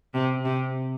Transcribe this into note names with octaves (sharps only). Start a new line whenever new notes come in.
C3
C3